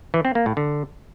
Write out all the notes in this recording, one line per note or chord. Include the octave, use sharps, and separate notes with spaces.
E3
C4
A#3
A2
D3